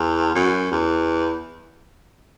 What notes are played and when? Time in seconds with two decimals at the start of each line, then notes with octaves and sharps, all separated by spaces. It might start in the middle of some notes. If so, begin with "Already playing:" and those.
Already playing: E2
0.35 F#2
0.72 E2